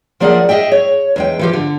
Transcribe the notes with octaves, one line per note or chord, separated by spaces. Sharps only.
F3 A#3 G#4 D5 E5 F#5
G#4 D#5 E5 G5
C#5
E2 G#3 G5
E3 F3 G4
D3